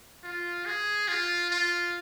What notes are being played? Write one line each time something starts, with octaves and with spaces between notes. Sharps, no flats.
F4
G#4
F4
F4